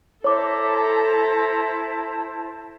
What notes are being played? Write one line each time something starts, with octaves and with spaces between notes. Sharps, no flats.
E4 A4 C5 C#5 A5 A#5 D6